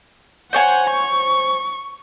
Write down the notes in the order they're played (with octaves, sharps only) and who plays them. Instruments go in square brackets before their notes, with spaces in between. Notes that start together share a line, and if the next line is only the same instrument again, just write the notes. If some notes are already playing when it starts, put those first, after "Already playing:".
[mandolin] C5 C#5 G#5 [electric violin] F#5
[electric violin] C#6